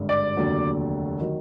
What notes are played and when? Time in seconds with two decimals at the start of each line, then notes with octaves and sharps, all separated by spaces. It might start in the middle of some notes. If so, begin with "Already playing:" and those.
Already playing: G#1 G2 D3
0.09 D5
0.36 F1 D#2 D3 F#3
1.20 D#3 F#3